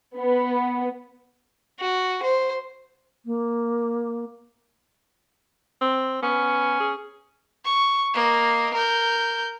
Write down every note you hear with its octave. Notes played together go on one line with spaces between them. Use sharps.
B3
F#4
C5
A#3
C4
B3 C#4
G#4
C#6
A#3 D#5
A#4 G6